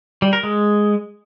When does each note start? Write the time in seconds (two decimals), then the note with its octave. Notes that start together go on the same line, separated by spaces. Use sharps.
0.22 G3
0.33 A#4
0.43 G#3